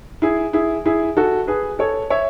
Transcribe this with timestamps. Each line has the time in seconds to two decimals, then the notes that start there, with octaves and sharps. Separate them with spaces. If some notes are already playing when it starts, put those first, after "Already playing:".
0.22 E4 G#4
0.53 E4 G#4
0.86 E4 G#4
1.17 F#4 A4
1.47 G#4 B4
1.79 A4 C#5
2.10 C#5 E5